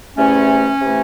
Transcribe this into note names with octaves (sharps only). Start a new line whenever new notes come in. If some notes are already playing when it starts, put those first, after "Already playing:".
E2 C3 E3 A3 C#4
C3 E3 A3